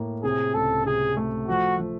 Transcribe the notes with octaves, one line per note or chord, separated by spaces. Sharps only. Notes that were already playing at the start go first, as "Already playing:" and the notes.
Already playing: A2 A#3
C3 G#4
C#2 A4
C3 G#4
A3
F3 F#4
F3